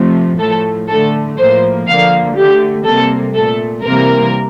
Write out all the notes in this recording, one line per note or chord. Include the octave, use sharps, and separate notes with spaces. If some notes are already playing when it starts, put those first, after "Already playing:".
Already playing: C3 F3 A3
A2 F3 A3 A4
D3 A3 A4
A2 F3 A#3 C5
D3 F3 A#3 F5
D3 A3 G4
C3 G3 A#3 A4
A#2 A3 A4
C3 E3 G3 A#3 A#4